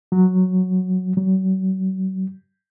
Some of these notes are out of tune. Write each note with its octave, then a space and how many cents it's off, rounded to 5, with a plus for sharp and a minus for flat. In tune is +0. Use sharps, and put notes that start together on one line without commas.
F#3 -5
F#3 +35